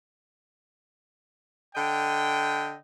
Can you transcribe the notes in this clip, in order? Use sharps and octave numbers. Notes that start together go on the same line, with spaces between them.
D3 D#5 G5